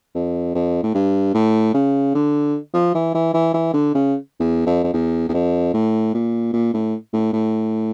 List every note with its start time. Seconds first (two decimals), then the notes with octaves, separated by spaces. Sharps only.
0.15 F2
0.55 F2
0.83 A2
0.94 G2
1.34 A2
1.74 C#3
2.15 D3
2.74 F3
2.95 E3
3.15 E3
3.34 E3
3.54 E3
3.73 D3
3.94 C#3
4.40 E2
4.66 F2
4.84 F2
4.93 E2
5.29 E2
5.34 F2
5.74 A2
6.14 A#2
6.53 A#2
6.74 A2
7.13 A2
7.33 A2